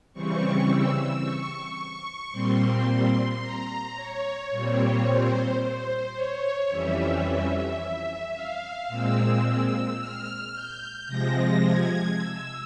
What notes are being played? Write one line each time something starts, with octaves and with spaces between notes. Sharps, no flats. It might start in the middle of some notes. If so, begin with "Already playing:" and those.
C#3 E3 G3 C4 C#6
E6
C#6
A#2 G3 C4 C6
A#5
C#5
A#2 G3 C4 C#5
C5
C5
C#5
F2 E3 G3 C#4 E5
F5
A#2 G#3 C4 E6
F6
G6
C3 F3 G#3 A#6
G#6
E6